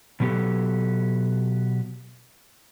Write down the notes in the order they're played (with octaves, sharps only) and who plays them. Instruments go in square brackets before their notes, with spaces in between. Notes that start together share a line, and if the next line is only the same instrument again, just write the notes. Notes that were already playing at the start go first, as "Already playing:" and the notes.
[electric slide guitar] B2 F#3 B3 E4 G4 A4